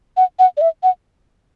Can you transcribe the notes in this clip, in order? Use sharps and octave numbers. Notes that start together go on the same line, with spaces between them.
F#5
F#5
D5
E5
F#5